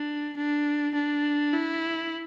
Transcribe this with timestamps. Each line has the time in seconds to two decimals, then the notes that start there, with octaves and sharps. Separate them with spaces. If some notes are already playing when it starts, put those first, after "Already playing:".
Already playing: D4
0.37 D4
0.95 D4
1.54 E4